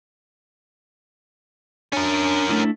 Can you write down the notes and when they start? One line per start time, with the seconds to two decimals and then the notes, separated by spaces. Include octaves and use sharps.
1.93 C#4 D4 A#4
2.49 A3 D4 E4